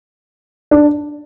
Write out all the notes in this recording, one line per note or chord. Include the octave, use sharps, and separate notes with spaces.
D4